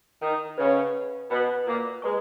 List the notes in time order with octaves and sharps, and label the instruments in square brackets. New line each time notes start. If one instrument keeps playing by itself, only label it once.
[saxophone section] D#3 D#4
[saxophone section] C#3 C#4 [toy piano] B4 D#5 F#5 B5
[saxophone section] B2 B3 [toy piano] B4 D#5 F#5 B5
[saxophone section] A#2 A#3
[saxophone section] G#3 [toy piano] B4 D#5 A#5 C#6